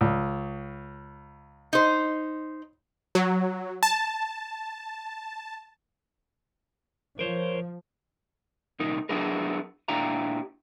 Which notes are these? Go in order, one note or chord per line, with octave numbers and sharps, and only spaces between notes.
C#2
D#4 C5
F#3
A5
F3 A#4 C5 C#5
C2 A#2 D#4 A#4
F#3 B3 D4 E4 G#4 A#4
A#2 D4 E4 G4 F5 A#5